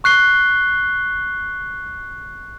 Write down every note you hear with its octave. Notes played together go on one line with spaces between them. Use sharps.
C#6 F#6 C7 G7